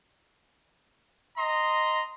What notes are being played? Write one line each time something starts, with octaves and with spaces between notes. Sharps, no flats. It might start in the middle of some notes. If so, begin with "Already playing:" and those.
D#5 A#5 C6